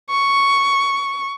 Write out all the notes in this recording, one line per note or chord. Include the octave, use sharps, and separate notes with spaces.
C#6